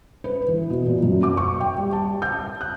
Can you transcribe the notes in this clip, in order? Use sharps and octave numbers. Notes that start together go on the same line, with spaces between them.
B4
E3
B2
A#2
F#2
D6
C#6
G5
G3
A5
G6
F#6